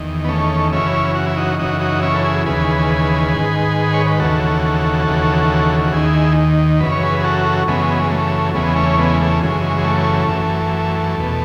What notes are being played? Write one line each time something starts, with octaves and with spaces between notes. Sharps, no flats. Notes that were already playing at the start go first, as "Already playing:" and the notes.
Already playing: E2 D#3
B3
A3 C#4
F#2 C#3 E3 C#4 E4
F#4
E4
D#4 F#4
F#2 C#3 E3 D#4 F#4
D#4 F#4
C#4 E4
A4
E4 G#4
D#2 C#3 E3 G#4 B4
G#2 D#3
C#5
B4
D#2 C#3 E3 F#4 A4
D#2 C#3 E3
F#4
D#2 D#3 E4 G#4
F#2 C#3 E3 B4
C#5
G#4 B4
G#4
F#4 A4
F#2 C#3 E3 G#3 B3
G#3
A3
E2 C#3 E3 G#3 B3
A3 C#4
G#3 B3
A3
F#2 C#3 E3 G#3
G#3
A3
F#2 E3
E2 B2